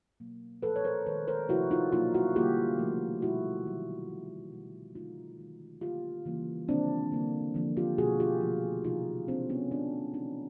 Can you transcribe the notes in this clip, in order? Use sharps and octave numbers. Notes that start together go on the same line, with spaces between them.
B2 F#3 A#3
A#2 F3 A3 A4 B4
C#5
A#4 C5
D#3 G#3 B4 C#5
A#4 C5
C3 F3 A3 E4 F#4
D#4 F4
B2 F#3 A#3 D#4 F4
E4 F#4
D3 G3 A#3 F4 G4
C3 F3 A3
B2 G3 A#3 E4 F#4
D#3 F#3 A3
B2 G#3
B2 G#3
D3 F#3 A3 D#4 F4
D#3 G#3
D3 F#3 A#3 F4 G4
C#3 E3 G3 A#3
C3 D#3 F#3 A#3 C4 D4
D3 G3 A#3
D3 F3 A#3
F4 G4
B2 G3 A#3 F#4 G#4
F4 G4
C3 F3 A3
C3 F3 A3 D#4 F4
C#3 F#3 A#3 C4 D4
B3 C#4
C3 F3 G#3 C4 D4
C3 E3 A3 C#4 D#4